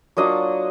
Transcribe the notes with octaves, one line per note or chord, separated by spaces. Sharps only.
F#3 A#3 D4 F4 D#5